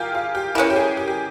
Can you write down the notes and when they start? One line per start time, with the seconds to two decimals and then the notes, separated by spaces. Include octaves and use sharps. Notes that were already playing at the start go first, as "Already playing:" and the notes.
Already playing: F4 G4 G#4 A#4
0.15 F4
0.35 G4
0.55 E3 G#3 C#4 A#4
0.70 G4
0.76 G#4
0.97 G4
1.08 G4